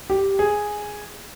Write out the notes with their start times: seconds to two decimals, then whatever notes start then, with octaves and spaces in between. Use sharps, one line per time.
0.10 G4
0.39 G#4